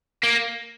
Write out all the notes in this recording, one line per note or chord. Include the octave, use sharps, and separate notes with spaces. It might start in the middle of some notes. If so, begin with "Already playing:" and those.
A#3